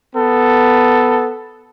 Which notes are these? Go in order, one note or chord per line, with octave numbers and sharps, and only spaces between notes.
B3 A4